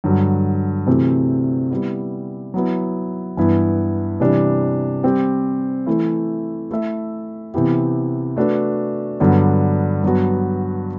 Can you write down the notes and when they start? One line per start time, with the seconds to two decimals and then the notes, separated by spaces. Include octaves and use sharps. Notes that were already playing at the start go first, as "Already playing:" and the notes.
0.04 G2 D3 F#3
0.87 C3 E3 A3 C4 F#4
1.71 G3 B3 E4
2.54 F#3 B3 E4
3.37 G2 E3 B3 E4
4.20 C3 E3 G3 D4
5.03 G3 C4 G4
5.86 E3 A3 E4
6.71 A3 E4 A4 E5
7.54 C3 E3 B3 E4 G4
8.36 A3 D4 F#4 B4
9.20 G2 D3 F#3 B3 D4
10.03 G2 F#3 B3 F#4